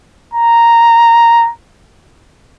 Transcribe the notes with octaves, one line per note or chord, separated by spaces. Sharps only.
A#5